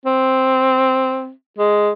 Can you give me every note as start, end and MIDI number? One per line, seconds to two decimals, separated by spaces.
0.05 1.31 60
1.58 1.91 56